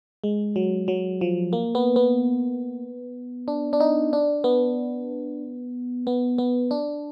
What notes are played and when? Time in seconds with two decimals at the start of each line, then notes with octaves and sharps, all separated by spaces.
0.24 G#3
0.56 F#3
0.88 F#3
1.21 F3
1.53 A#3
1.75 B3
1.96 B3
3.48 D4
3.73 D4
3.80 D#4
4.13 D4
4.44 B3
6.07 B3
6.38 B3
6.71 D4